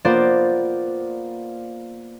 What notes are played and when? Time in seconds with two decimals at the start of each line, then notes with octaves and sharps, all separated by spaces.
0.05 A#3 B3 F4 A#4 C5 D5